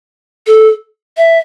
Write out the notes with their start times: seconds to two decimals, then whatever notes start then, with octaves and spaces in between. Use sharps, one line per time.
0.47 A4
1.17 E5